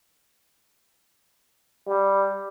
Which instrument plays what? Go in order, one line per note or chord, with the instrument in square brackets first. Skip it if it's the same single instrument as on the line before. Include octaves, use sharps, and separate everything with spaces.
[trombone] G3